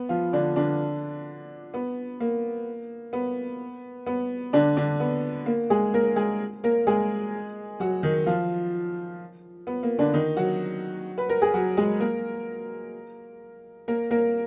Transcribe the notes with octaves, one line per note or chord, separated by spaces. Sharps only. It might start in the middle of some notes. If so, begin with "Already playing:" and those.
Already playing: B3
F3 F4
D3 D4
D3 D4
B3
A#3
B3
B3
D3 D4
D3 D4
B3
A#3
G#3 G#4
A#3 A#4
G#3 G#4
A#3 A#4
G#3 G#4
F#3 F#4
D#3 D#4
F3 F4
B3
A#3
D3 D4
D#3 D#4
F#3 F#4
B4
A#4
G#4
F#3 F#4
G#3 G#4
A#3 A#4
A#3 A#4
A#3 A#4